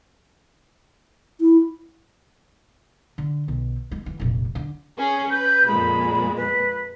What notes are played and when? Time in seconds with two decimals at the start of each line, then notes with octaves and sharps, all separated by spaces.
1.41 E4
3.18 D3
3.48 B1
3.91 G#3
4.06 E3
4.20 F1 A#1
4.55 D3
4.97 C#4 G#4
5.31 B4 G6
5.67 F2 A#2 G#3 B5
6.37 B4